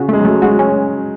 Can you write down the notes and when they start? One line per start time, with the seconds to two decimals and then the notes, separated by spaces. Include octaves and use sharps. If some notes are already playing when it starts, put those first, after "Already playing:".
Already playing: C#3 F#4
0.09 G#3 A3
0.19 F#3
0.25 A3
0.42 G#3 F#4
0.59 C#4